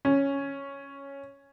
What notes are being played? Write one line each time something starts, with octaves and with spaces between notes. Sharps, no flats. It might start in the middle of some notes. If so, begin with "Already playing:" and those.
C#4